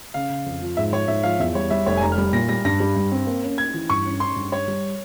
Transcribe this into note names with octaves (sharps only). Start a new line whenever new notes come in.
C#3 F5
C#3
F2
F3
G#2 E5
F3 C#5
G#2 E5
F3 F5
E2 E5
G3 C#5
G3 E5
F1 C#5
G#5
G3 A#5
F6
G3
A#2 A#6
G3 A#6
G2 A#6
G3
G2
C4
A#3
C#4
C#4 G#6
E3
G2 C#6
C#4
C#4 C6
G2
G3 C#5
G3